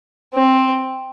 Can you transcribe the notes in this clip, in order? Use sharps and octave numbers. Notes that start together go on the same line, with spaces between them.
C4